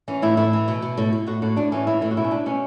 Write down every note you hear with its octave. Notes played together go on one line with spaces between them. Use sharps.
E3 C#4
A2 E4
A2 E4
E3
B2
B2
A2
A2
A2 F#4
A2 F#4
A2 D4
E3 C#4
E3 E4
A2 E4
F#4
B2 E4
C#4
B2 D4
B2 C#4